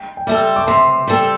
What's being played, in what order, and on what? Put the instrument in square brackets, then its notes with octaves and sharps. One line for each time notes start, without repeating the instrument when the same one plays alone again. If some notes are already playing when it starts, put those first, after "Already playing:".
Already playing: [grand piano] G5
G5
[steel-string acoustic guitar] G3 C4 A4 [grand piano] E5
[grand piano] D6
[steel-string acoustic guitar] C3 [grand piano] C6
[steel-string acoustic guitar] G3 C4 A4